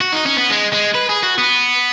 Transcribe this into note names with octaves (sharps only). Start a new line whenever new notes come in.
F#4
D#4
C#4
B3
G#3
G#3
B4
G#4
F#4
B3